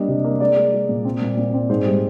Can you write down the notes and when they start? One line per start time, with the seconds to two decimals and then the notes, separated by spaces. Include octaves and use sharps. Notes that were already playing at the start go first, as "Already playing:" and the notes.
Already playing: G3 A#3 D4 D#5
0.08 C3
0.24 A#3
0.40 G#3 D5
0.56 G#3
0.73 G#3
0.89 A#2
1.05 C4
1.21 A#2
1.37 A#2
1.54 C4
1.70 G#2 C5
1.86 G3